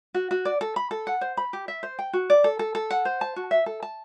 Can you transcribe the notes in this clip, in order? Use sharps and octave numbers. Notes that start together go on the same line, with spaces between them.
F#4
F#4
D5
A4
B5
A4
F#5
C5
B5
G4
E5
C5
G5
F#4
D5
A4
A4
A4
F#5
C5
A5
F#4
E5
A4
A5